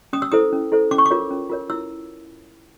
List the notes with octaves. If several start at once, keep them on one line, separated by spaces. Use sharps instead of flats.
C#4 D#6
E6
E4 A4 C5 D#6
C#4
E4 A4 C5
C#4 D6
C#6
D6
F4 A#4 C#5
C#4
F4 A#4 C#5
E4 E6